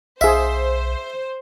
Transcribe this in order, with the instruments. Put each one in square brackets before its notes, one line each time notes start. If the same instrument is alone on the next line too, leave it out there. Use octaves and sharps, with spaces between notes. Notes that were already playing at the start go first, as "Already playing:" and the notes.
[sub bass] B1 [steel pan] G#4 F5 [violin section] C5 [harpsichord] E5